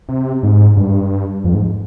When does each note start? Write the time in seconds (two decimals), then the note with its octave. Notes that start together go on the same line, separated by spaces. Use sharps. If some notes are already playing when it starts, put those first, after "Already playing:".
0.09 C3
0.43 G#2
0.77 G2
1.45 F2
1.54 G#2